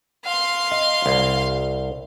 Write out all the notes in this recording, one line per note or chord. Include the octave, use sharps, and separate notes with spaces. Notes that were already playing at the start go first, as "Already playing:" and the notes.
F5 C6
D#5
C2